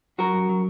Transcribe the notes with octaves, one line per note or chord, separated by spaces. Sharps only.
F#3 F#4 A#4
F#2
F#3